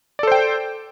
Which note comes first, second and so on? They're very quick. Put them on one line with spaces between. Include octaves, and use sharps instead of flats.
D5 A4 C5 G5